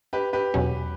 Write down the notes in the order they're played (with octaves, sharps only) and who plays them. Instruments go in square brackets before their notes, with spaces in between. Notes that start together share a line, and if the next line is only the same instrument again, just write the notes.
[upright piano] G4 B4
G4 B4
[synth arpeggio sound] E2 B2 F#3 C#4